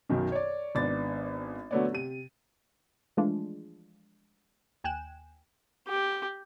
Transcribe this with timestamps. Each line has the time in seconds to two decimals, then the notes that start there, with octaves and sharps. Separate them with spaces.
0.09 B1 F#2 B2 D#3
0.32 C#5 D5
0.75 G#1 B3 D4 A6
1.71 D3 F#3 A3 B3 C#5 D5
1.92 C3 D#7
3.17 E3 F3 G#3 A3 D4 F4
4.84 D#2 G5 G#5 F#6 E7
5.87 G4